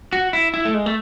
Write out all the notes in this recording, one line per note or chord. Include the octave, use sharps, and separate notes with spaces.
F#4
E4
E4
A3
G#3
A3